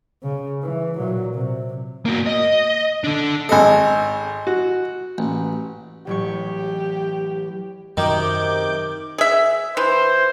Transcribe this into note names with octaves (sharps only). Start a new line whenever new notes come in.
C#3
E3
A#2 F#3
C3
A#3 F#4
D#5
D4 A4
G#1 A4 D#5 G#5
F#4
A1
A1 F#3 G4 C#6
F#2 C3 D#3 D6 G6
G#4 E5
E3 C5